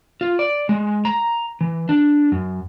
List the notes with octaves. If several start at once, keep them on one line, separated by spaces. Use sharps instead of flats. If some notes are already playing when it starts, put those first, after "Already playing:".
F4
D5
G#3
A#5
E3
D4
F#2